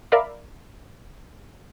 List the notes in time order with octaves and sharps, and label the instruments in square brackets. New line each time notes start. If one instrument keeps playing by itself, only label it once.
[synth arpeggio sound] A#4 D5 E5 F5 B5 D6